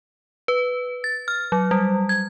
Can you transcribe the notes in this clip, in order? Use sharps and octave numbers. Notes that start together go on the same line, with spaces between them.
B4
A6
F6
F#3
G3
G#6